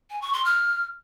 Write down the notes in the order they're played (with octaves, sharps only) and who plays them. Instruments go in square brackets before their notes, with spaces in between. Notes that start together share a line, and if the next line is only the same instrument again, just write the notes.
[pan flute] G#5
C#6
C6
F6